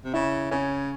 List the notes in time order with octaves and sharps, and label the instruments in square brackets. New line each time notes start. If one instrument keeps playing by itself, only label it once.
[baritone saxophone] C3
[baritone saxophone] C#3 [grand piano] E4
[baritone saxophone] C#3 [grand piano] C#4